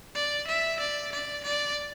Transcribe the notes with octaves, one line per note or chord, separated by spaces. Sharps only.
D5
E5
D5
D5
D5